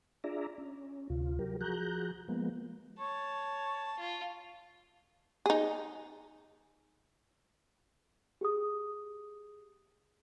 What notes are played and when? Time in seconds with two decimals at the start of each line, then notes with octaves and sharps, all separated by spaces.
0.24 D4 F4 G#4 D5 E5 A#5
0.58 C#4
1.10 D2 C3 F4
1.39 F#3 G4 A#4
1.61 F3 F#4 G#4 A#5 F#6 G6
2.28 F3 G#3 A#3 B3
2.99 C#5 A5
3.99 F4
5.46 D#4 G#4
8.41 G4 G#4 D#6